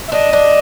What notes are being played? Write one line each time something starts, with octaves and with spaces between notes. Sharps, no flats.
E5
D4 D#5
D4